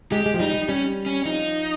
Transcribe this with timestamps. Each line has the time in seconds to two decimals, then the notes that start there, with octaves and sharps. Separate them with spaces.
0.12 G#3 G4
0.26 G#3
0.34 F3
0.40 G3 D#4
0.54 G3
0.69 G3 C#4
1.06 C#4
1.25 F3 D#4